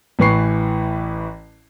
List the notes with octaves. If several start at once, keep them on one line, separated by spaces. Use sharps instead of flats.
A1 E3 B4 C#6 C7